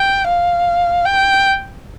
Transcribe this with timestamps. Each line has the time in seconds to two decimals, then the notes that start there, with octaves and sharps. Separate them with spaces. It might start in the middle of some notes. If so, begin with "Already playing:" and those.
Already playing: G5
0.28 F5
1.06 G5